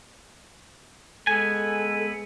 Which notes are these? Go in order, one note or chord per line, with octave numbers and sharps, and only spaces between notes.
G#3 B3 A4 G#5